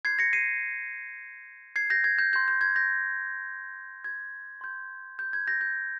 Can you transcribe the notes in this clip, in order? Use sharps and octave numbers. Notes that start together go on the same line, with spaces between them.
C6 G6 G#6 C7
A#6 C#7
C7 D#7
G#6 C7
G6 A#6
G#6
G6
C6 G6
G6
G#6
G6 A#6
G#6
C6 G6
G6
G#6
G6 A#6
G6